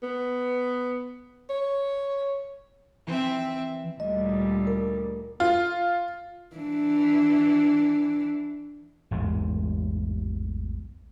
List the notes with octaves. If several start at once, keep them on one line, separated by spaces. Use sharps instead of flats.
B3
C#5
E3 C4 E5
D2 A#2 G3 D#5
A#4
F4
E3 D4
A1 E2 G#2 G#3